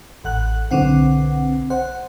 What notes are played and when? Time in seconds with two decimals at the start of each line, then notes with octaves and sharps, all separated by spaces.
0.24 A1 F#5 F#6
0.71 B1 D3 C4 F#5
1.70 C5 F#5